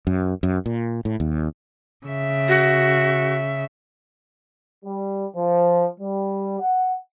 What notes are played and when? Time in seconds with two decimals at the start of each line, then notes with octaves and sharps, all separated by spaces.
0.07 F#2
0.43 F#2
0.66 A#2
1.05 A2
1.20 D#2
2.06 C#3 E5
2.48 F#4
4.84 G3
5.36 F3
6.00 G3
6.60 F#5